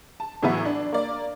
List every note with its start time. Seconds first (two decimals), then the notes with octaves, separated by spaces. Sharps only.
0.20 A5
0.42 A2 E3 F#3 B3 E4
0.65 D4
0.93 A#3 D5